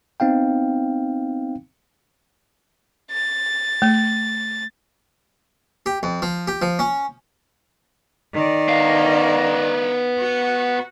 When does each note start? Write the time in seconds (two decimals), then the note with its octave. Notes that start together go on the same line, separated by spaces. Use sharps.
0.20 B3 C4 D#4 F5 G5
3.11 A6
3.82 A3
5.86 G4
6.03 F2
6.22 F3
6.48 G4
6.62 F3
6.79 C#4
8.34 D#3 D5
8.68 B3 F5
10.18 F#4